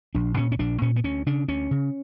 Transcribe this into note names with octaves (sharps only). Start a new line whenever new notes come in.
A#1 D4
A#2 C#4
C#4
A#1 D4
A#2 C#4
B3
D2 C#4
C#3 D4
D2 C#4
C#3